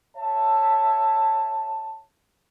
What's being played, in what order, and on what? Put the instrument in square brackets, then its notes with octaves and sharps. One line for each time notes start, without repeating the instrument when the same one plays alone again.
[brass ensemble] C#5 E5 A5